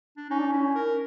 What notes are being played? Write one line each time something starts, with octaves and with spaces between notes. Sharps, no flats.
D4
C#4 D#4
D4
C#4
E4
A#4